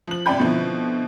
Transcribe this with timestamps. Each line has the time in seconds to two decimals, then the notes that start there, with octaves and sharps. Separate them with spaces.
0.07 F3 F#7
0.26 G#1 C3 D5 G5 B5 G6
0.40 B2 D3 F3 C4 E4